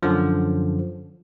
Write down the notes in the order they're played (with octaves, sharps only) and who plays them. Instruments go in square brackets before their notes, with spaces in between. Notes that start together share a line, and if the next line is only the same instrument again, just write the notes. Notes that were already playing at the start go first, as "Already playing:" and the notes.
[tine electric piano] F#2 D3 F3